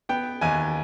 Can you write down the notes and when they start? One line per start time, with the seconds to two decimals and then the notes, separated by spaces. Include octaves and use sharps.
0.09 B3 G5
0.41 D#2 G#5